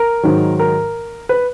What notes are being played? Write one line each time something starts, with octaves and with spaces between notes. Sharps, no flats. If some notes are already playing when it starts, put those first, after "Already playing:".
Already playing: A#4
G#2 D#3 F#3
A#4
B4